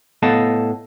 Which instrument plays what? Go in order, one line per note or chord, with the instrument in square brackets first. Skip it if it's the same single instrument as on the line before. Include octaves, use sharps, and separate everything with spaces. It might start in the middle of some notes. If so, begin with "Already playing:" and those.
[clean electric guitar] A2 B3 A4 D#5 F5 A5